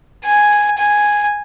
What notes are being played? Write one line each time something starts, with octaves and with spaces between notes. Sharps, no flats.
G#5
G#5